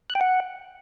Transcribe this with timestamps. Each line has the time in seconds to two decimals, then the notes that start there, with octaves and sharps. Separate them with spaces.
0.10 F#6
0.15 G5
0.21 F#5